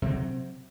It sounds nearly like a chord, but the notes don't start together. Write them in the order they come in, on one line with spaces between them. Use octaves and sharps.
C3 C4 F#3